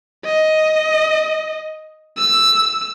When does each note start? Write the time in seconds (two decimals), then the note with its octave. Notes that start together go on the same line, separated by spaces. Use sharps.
0.25 D#5
2.18 E6